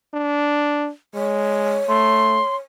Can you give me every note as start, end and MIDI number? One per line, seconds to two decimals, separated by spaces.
0.14 0.89 62
1.14 1.81 56
1.14 2.59 73
1.89 2.41 57
1.89 2.56 84